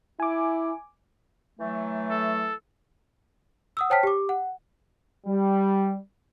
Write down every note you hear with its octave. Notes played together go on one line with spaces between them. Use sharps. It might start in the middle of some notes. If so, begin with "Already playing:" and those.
E4 G#5 D6
E3 F#3 A3
A4
F#5 D#6 E6
C5 C#5 G5 A5 F6 B6
G4 D6
F#5
G3